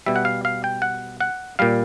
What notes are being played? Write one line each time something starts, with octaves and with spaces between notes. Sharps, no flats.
B2 G3 E5
F#5
F5
F5
G5
F#5
F#5
A#2 G3 F5